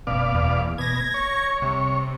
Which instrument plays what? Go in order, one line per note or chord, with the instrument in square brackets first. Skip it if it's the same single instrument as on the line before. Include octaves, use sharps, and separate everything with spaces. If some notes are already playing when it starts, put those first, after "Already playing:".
[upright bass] F#1 C#4 [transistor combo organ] B2 D5 F5
[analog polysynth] E2
[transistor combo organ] B2 [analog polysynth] G#6 A#6
[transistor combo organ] C#5
[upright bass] C2 [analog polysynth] C3